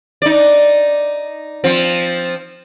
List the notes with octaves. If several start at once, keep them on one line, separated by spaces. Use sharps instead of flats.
D#4 D5
F3 C4